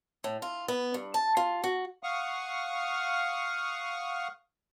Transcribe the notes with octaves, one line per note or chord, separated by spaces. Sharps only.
A2
F4
B3
G2
A5
F4
F#4
F5 F#5 C#6 D#6 F6